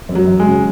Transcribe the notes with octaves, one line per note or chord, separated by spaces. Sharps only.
F#2
F#3
F#2
G#3
C#3